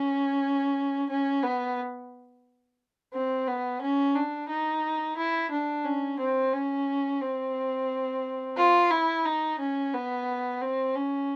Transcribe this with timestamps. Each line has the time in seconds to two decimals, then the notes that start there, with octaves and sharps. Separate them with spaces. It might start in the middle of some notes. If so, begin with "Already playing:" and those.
Already playing: C#4
1.10 C#4
1.43 B3
3.14 C4
3.48 B3
3.81 C#4
4.16 D4
4.49 D#4
5.17 E4
5.51 D4
5.85 C#4
6.19 C4
6.54 C#4
7.22 C4
8.57 F4
8.91 E4
9.25 D#4
9.59 C#4
9.94 B3
10.61 C4
10.95 C#4